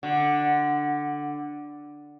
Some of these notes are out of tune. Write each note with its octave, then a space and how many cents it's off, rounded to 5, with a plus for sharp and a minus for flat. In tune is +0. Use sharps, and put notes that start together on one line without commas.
D3 +0 F#4 +0